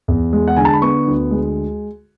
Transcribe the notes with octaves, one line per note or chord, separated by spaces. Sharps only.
E2
G#3
F#5
D3 G#5
A5
B5
B3 C#6
D2
G#3